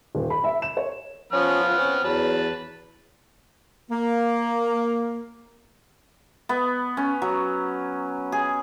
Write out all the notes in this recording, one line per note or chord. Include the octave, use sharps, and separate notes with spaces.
D#1
B5
E5
E7
C#5
F3 B3 C#4 B4 F6
F4
C4 C#4
E2 F#3 B4 A5
A#3
B3
C#4
F#3
G#4